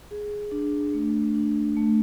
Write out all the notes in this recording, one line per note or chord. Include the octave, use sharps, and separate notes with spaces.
G#4
D4
A3
D4
A3